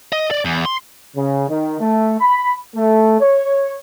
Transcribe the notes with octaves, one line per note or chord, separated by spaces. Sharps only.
D#5
D5
E2
C6
C#3
D#3
A3
B5
A3
C#5